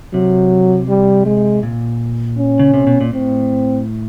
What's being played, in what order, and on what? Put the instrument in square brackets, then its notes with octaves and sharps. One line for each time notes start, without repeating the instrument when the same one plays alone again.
[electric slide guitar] C3 [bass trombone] F#3
[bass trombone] G3
G#3
[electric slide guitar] A#2
[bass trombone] C#4
[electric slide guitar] C#3
C3
B2
A#2
[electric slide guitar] A2 [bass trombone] C4